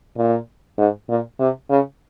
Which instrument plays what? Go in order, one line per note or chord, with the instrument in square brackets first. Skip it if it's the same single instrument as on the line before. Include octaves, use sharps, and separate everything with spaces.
[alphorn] A#2
G#2
A#2
C3
C#3